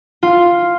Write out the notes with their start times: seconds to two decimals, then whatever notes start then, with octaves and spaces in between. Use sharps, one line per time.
0.23 F4